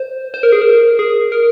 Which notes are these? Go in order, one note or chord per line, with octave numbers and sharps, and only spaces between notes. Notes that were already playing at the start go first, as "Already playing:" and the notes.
Already playing: C5
C5
A#4
G#4
A#4
G#4
A#4